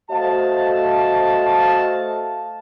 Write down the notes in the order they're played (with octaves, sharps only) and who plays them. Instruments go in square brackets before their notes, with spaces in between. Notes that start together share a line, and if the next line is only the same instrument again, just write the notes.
[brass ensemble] A3 F#4 C5 D#5 F5 A5